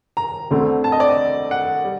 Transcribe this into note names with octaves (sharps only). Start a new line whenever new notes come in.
A#5
D2 D3 A3 C4
A5
D#5
D5
D#5
F#5
G3